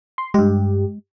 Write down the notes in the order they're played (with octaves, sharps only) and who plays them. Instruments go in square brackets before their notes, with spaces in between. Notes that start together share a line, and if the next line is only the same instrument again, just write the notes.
[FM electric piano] C6
[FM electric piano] G2 G4 [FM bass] G#3